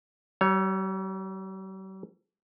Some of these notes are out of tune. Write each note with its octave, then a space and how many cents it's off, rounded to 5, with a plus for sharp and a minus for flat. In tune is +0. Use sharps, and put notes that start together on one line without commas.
G3 -45 C#5 +0